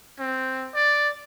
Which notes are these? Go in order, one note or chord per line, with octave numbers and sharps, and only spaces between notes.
C4
D5